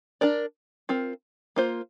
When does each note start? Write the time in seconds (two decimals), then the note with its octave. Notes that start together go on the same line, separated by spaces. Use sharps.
0.21 D4 A#4 D5
0.89 C4 F4 A#4
1.56 A#3 F4 C5